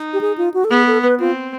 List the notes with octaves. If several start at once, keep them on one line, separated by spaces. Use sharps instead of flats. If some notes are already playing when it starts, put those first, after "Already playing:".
Already playing: D#4
G4
G#4
F4
F#4
A4
B3 G#4
A4
B4
C4 F4